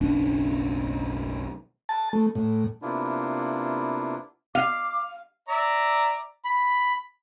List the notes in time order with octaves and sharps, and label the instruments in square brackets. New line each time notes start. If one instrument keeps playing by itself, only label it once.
[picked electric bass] F#1 B1 C#4 D4
[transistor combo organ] A5
A3
A2
[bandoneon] C3 A#3 B3 D4 E4 F4
[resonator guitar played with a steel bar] F5 [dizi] D6
[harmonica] D5 E5 A#5
[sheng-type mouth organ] B5